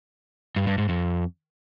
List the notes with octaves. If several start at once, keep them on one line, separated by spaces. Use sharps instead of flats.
G2
G2
G#2
F2